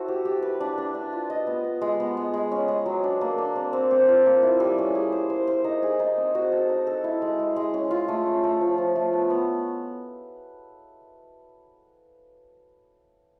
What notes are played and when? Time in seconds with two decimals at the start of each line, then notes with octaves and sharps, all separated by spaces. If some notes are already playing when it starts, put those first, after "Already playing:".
Already playing: E4 F#4 A4 C5
0.08 G4
0.25 G4
0.42 B4
0.60 D4
0.78 D4
0.94 D4
1.13 F4
1.30 D#5
1.47 B3
1.64 B3
1.82 G#3
2.00 B3
2.17 G#3
2.33 G#3
2.52 C#4
2.68 G#3
2.86 F#3
3.04 D4
3.21 A#3
3.38 D4
3.56 C4
3.73 C4
3.91 C4
4.08 F4
4.26 A#3
4.43 E4
4.60 G3
4.78 C#4
4.95 G#4
5.12 C5
5.30 C5
5.47 C5
5.64 D#4
5.82 G#4
6.00 D#4
6.17 C4
6.35 F#4
6.52 A4
6.69 D#4
6.87 A4
7.04 E4
7.22 G#3
7.39 G#3
7.56 G#3
7.74 C#4
7.91 F4
8.08 A3
8.26 C#4
8.44 A3
8.61 F3
8.78 F3
8.96 A3
9.13 B3
9.30 B3